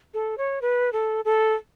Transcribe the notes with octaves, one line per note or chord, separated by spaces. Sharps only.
A4
C#5
B4
A4
A4